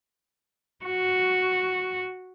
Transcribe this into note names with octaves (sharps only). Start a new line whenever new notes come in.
F#4